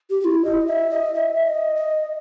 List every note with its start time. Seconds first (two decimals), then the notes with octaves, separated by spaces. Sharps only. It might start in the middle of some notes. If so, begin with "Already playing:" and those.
0.10 G4
0.21 G4
0.25 E4
0.45 D#5
0.67 E5
0.90 D#5
1.14 E5
1.35 E5
1.44 D#5
1.76 D#5